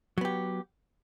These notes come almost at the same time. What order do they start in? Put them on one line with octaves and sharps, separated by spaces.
F#3 B3 G4